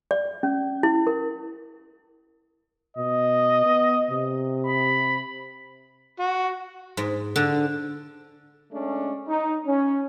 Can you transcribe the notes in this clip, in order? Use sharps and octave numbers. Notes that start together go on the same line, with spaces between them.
D5
C#4
E4
A#4
B2 D#5
B3
C3
B5
F#4
G#2
D3
G#3 A3 C#4 D4
D#4
C#4